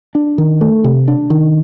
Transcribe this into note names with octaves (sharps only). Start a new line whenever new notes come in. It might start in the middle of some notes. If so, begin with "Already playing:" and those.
D4
D#3
A3
C3
D4
D#3